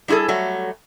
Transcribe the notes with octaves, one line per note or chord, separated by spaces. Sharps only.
G3 E4 F#4 G#4 A4
F#3 G3 A3